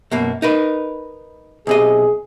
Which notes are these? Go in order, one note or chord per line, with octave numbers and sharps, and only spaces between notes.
F#2 B2 A#3
D#4 A#4 B4
B1 C3 G#4 D#5